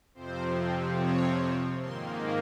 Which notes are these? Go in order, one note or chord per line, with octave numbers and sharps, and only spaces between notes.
F2 C3 F3 C4 C5
C#5
G#2 D#3 A#3 C6